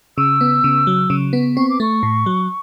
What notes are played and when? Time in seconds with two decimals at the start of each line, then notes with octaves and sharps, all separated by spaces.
0.18 C#3 E6
0.41 B3
0.64 C#3
0.87 F#3
1.10 C#3
1.33 B3
1.57 C4 C#6
1.70 D6
1.80 A3 C#6
2.03 A2
2.26 F#3